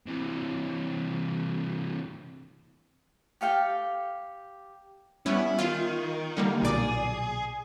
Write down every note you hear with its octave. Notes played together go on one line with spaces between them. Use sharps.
C3 E3
G4 A4 F5 G5
G3 B3 C#4 E4
D#3 F4
D3 G3 A#3
B1 A#2 G#4 D5